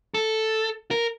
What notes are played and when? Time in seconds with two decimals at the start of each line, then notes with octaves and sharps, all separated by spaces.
0.14 A4
0.91 A#4